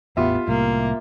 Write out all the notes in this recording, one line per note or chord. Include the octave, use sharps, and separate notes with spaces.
A1 E2 B3 F4 G4 E5
C2 A2 A#3